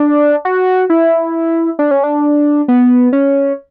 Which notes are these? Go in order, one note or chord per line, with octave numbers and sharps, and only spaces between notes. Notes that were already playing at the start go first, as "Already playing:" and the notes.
Already playing: D4
F#4
E4
D4
C#4
D4
B3
C#4